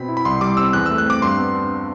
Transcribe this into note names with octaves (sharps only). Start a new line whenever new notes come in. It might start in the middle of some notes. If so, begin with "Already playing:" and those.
Already playing: B2 C4 B5
E4
B5
C2 C6
G3 D6
C4 E6
E2 F#6
E6
A3
F#6
C4 D6
G2 C6
B3
D4